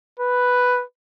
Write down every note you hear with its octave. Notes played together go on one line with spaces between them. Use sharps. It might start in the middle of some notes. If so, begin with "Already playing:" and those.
B4